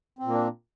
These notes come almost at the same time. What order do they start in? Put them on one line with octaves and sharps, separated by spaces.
C4 A#2 A#3 D4